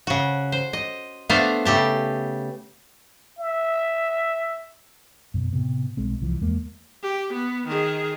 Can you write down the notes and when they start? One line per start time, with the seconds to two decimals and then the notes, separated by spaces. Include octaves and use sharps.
0.07 C#3 F#4
0.52 C5
0.73 D#5
1.29 A3 B3 D4 C5 F5
1.65 C#3 A3 G4 A5
3.38 E5
5.34 F#2 B2
5.53 A2 C3 B3
5.97 B1 G#3 C4
6.21 C2 E3 F3
6.41 E2 G#3 A#3
7.03 G4
7.33 B3
7.67 D#3 G#4